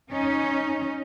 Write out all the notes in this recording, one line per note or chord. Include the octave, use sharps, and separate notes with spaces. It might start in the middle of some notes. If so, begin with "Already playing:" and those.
C#4 D#4